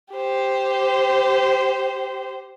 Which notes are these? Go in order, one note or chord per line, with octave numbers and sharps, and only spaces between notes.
G4 C5